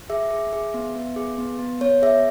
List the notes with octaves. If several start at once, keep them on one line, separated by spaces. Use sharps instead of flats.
G#4 E5
G#4
G#4
B3
B3
G#4
B3
B3
B3 C#5
G#4 E5